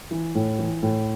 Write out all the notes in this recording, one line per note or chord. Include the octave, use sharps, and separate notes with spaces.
E3
A2
E3
A2